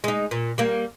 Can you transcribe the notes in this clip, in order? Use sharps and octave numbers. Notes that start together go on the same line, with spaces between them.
G#3 D#4
A#2
G3 A#3